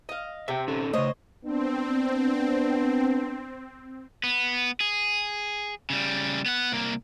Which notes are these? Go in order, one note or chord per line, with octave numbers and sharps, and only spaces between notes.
D#5 F5
C3 E5 G5
C#4 D#4 A4
C#3 A3 C5 C#5 D#5
B3 C4 D4
B3
G#4
C#3 G3
B3 F#5
C2 A#3